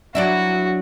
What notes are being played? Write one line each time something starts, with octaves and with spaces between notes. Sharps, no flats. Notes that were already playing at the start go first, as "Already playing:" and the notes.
F#3 D4 E4 F#4